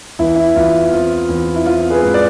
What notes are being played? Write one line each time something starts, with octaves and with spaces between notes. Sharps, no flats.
E2 E4
E4
E2 F4
C4 F4
E2
E4
C4 F4
G#4 B4
G#2
D5